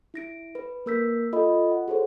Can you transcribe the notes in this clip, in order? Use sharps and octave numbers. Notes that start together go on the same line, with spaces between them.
E4 A#6 D7
B4
A#3 A#4 E6 G6 B6
F4 A4 D#5 B5
F#5
F#4 G#4 A4 C5 C#5